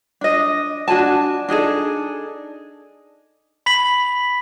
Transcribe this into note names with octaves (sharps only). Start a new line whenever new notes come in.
D4 D#5
D4 F#4 G#5 A5
D4 D#4 G#4 A4
B5 B6 F#7